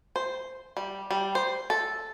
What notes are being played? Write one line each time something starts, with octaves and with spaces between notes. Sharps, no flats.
C5
G3
G3
C5
A4